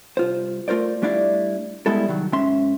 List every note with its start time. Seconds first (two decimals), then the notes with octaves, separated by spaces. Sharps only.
0.17 C2 F4 C5
0.68 A3 F4 A#4 C5 D5
1.02 G3 A3 D4 E4 D5 F5
1.86 G3 G#3 B3 E4 A4
2.06 C2 D#3 F#3
2.33 G#2 C#4 E5 C6